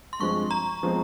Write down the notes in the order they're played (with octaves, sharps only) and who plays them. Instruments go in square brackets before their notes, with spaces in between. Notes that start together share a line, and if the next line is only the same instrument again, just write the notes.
[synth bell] C6
[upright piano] G2 F3 G#3 C4 [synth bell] C#6
[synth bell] A#5
[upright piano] F3 G#3 C4